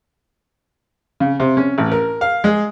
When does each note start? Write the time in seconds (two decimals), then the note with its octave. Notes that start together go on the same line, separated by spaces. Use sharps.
1.20 C#3
1.40 C3
1.57 C#4
1.78 A1
1.92 A#4
2.21 F5
2.44 G#3